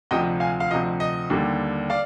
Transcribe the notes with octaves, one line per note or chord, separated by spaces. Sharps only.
D2 C3 F3 D#5 G5
F5 G#5
F5
D2 C3 F3 D#5
D#5
D#2 D3 G3
D5 F5